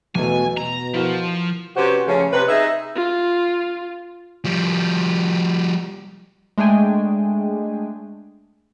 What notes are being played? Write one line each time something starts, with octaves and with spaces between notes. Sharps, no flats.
E2 B2 A3 G#5
B2 A#5
F3 E4 F#4 A#4
C3 C#4 F#4 G4 B4 C5
C#3 F3 A3 C#4
C3 B4
D#4 G#4 D#5 E5
F4
F3 G3
G#3 A3 D4 G#4 G5 G#5